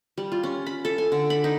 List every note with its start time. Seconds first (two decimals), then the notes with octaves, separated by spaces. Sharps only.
0.18 G3
0.32 F4
0.44 C#4
0.66 B5
0.85 A4
0.98 G#5
1.12 D3
1.30 B5
1.44 D#4